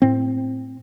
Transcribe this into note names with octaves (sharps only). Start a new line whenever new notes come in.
A2 C4